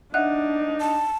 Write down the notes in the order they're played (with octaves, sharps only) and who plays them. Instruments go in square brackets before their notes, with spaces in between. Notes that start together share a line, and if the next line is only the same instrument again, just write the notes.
[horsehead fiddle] D4 [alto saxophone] D#4 [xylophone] E5 F#5 F#6
[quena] A5